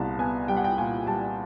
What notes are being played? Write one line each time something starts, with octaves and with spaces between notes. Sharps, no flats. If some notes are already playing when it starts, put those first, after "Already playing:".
Already playing: C2 A#2 B3 A5
B3 G#5
G3 G5
F#5
G5
A#2 G#5
G3 A5